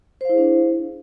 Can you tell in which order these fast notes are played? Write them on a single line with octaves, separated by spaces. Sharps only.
C5 F5 E4 G#4 D4